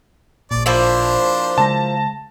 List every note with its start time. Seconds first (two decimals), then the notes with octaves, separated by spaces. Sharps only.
0.51 A1 A#2 D5
0.66 F3 A#3 D4 E4 C5
1.58 C#3 G#3 A5 A#6